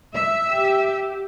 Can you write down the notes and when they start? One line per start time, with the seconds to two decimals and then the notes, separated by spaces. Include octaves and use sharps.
0.13 E5
0.51 G4